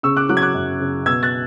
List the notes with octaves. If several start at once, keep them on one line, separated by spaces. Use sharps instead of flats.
C#3 C#6 E6
D6 F#6
F#3 D6 F#6
G#6
D6 F#6
F#2
C#3
B2 E6 G#6
F#6 A6